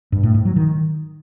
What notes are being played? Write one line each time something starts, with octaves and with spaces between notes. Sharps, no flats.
G2
A2
G#2
F#3
D#3